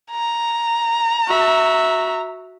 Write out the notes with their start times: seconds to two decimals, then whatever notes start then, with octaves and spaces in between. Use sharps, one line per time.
0.11 A#5
1.28 F#4 E5